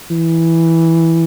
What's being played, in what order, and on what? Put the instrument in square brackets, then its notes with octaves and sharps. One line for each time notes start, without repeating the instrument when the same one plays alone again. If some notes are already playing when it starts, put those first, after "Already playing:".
[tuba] E3